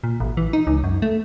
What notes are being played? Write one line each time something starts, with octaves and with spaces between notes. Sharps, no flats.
A#2
A1
E3
D#4
C#2
F#2
A3